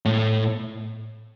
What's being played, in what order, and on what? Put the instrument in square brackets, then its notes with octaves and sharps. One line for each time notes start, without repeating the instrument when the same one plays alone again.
[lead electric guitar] A2